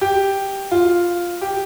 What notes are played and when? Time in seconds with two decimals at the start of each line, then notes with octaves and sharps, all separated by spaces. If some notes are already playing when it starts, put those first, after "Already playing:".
0.01 G4
0.71 F4
1.41 G4